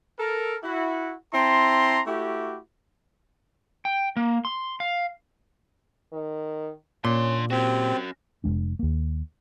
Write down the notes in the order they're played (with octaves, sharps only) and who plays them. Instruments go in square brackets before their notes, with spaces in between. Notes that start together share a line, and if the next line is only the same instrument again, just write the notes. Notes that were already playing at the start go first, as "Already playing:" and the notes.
[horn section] A4 A#4
E4 F#4
C4 E4 A5 A#5 C6
A3 E4 F#4 G4
[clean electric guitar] G5
A#3
C6
F5
[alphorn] D#3
[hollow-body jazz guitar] A#2 [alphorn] C#4 [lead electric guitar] D4 C6
[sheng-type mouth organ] C4 [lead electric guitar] C#4 F#4 [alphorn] G4
[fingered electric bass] F1 G#2 G#3 D4
D#2 A#3